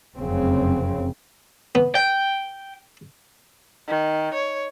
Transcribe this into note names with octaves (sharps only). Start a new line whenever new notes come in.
F1 F#2 C#3 C4
B3
G5
D#3
C#5